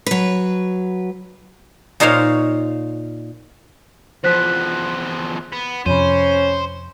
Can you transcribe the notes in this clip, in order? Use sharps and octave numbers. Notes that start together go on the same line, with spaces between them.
F#3 B4
A#2 D#4 C5 C#5 F5
E2 F3 C5 F#6 B6
B3
F2 C3 C#4 C5 B5 D#7